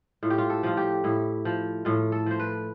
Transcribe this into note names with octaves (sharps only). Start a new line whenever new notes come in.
A2 F4
G4
F4
A4
F3 F4
G4
A2 E4
F3
A2 F4
A4
F3 C5
B4